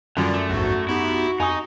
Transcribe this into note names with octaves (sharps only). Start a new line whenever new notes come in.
F#2 D3 D#3 G3 F4 D5
A3
A#1 E2 G#2 F#4
B3 D#4 E4 G4
F2 D#4 G#5 C#6 D#6